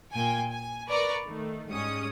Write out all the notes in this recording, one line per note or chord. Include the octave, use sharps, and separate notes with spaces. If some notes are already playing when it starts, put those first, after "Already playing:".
A#2 G5 G#5
G#5
A#4 B4 D5 A#5 C#6 D6
D#3 A3
G#2 G3 G#3 C#4 D#6 C#7